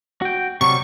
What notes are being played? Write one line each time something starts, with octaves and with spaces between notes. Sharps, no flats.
F#4 G5
C3 F#3 G3 C#6